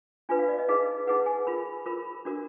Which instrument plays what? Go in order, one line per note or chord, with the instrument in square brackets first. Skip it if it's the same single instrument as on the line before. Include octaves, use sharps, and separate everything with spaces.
[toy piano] D4 F4 B4 G#5
F5
D5
D#5
D#4 G#4 B4 F5
D#4 G#4 B4 F#5
G#5
F4 A#4 B5
F4 A#4 B5
D4 F#4 A#4